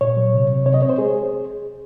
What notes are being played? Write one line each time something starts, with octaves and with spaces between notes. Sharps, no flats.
A#2 C#5
F#3
C3
C3
C3 C#5
D#5
C4 C#5
C5
G#3 G#4